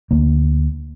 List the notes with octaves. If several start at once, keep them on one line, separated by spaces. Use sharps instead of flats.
D2 A#3